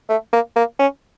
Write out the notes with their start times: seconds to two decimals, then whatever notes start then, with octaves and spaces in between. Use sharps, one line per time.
0.09 A3
0.33 A#3
0.56 A#3
0.79 C#4